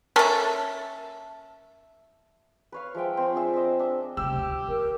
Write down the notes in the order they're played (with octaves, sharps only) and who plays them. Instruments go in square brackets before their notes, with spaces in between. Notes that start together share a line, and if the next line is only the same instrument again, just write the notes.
[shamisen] A#3 C#4 A4 [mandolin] E5 A5
[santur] B4 C#5 F5
F3 G#3 E5 G5
C4
D4 G#4 E5 A5
D#5 E5
D4 E5
[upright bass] C2 C3 [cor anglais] G4 [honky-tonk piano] E6
[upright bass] D2
[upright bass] C#4 [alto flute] A#4